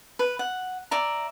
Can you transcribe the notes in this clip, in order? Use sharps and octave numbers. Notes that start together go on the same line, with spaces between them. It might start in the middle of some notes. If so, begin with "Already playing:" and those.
B4
F#5
D5 E5 A#5